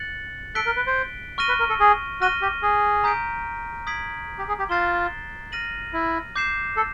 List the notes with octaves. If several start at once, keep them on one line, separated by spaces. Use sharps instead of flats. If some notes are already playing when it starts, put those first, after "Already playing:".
Already playing: F#6 A6 C#7 F#7
A4 F#6 B6 D7 G7
A#4
B4
C5
C#6 F6 A#6 D#7 G7
B4
A#4
A4
G#4
F#4 F6 A#6 D#7 G7
G4
G#4
A#5 D#6 G6 B6 D7
D#6 G#6 B6 D7 F#7
G4
G#4
G4
F4 F#6 A6 C7 E7 G7
F6 A#6 D#7 F#7
E4
D6 G6 C7 E7
A4